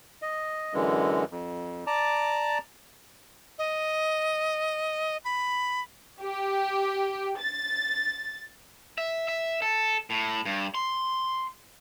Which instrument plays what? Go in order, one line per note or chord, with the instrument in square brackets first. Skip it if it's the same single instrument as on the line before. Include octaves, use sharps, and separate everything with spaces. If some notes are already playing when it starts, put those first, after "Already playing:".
[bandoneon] D#5
F#2 D3 E3 G#3
F2
D5 A5 A#5 D6
[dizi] D#5
B5
[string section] G4
A6
[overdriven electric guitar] E5
E5
A4
A2
G2
C6